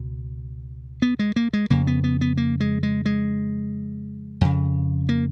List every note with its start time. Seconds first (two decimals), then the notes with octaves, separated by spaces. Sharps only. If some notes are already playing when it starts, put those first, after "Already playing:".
Already playing: C#2 B2
1.02 B3
1.19 G#3
1.36 A#3
1.53 G#3
1.70 F2 C#3 A#3
1.87 B3
2.04 B3
2.21 B3
2.37 A#3
2.60 G#3
2.83 G#3
3.06 G#3
4.41 F2 C#3
5.09 A#3